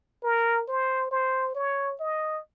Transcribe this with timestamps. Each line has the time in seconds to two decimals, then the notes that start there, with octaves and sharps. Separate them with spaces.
0.23 A#4
0.68 C5
1.11 C5
1.55 C#5
2.00 D#5